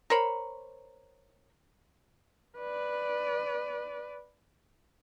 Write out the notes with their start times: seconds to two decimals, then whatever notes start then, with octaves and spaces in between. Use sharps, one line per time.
0.10 A#4 C5 C#5 B5
2.58 B4 D5